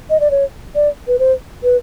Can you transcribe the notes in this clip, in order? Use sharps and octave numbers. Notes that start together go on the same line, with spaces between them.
D#5
D5
C#5
D5
B4
C5
B4